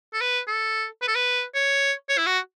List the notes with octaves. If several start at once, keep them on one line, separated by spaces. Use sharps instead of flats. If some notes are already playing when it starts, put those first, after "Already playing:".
A4
B4
A4
B4
A4
B4
C#5
C#5
E4
F#4